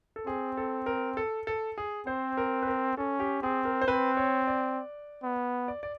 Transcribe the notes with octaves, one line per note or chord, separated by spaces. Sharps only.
A4
C4 G#4
A4
A#4
A4
A4
G#4
C4 C5
A#4
B4
A#4
C#4 A4
G4
C4 G#4
A#4
C5
C4 B4
C#5
D5
B3
D5
D5